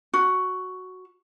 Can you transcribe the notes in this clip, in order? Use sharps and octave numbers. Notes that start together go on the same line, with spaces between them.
F#4